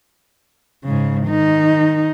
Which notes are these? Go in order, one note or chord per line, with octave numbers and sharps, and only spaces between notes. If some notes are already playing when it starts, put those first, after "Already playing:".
G#2 C#3
D#3 D#4